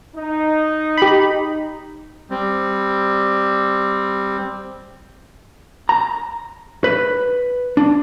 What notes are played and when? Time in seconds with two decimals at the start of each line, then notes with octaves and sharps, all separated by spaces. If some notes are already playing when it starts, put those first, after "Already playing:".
0.15 D#4
0.97 G4 B5
2.30 G3 C4
5.89 A#5
6.84 B4
7.77 D4